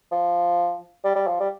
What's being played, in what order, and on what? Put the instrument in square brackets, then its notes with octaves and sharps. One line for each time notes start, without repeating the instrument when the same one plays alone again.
[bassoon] F3
G3
G3
F3
G3